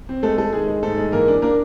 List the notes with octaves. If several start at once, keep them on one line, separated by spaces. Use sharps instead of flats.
C4
G#3 A3 A4
G#3 A3 A4
D#3 G#3 G#4
G#3
G#2 A3 A4
G#3
E3 A#3 A#4
D4
A#3 D4 A#4